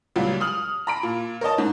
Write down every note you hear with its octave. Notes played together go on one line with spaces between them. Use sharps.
C#2 A#2 F#3 G3
D#6 F6 F#7
A#5 B5 D7
A#2
A#4 C#5 D#5 A5
G#2